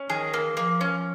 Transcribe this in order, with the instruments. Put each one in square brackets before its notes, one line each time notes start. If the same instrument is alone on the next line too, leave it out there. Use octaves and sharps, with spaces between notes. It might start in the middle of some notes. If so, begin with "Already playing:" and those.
Already playing: [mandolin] C#4
[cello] D#3 [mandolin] G#4
[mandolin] A#3
[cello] F3 [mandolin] A#3
[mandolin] C#4